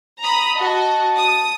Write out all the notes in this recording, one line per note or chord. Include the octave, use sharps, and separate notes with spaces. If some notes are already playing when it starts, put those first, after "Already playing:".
A#5 B5 D#6
F#4 D#5 A5
D#6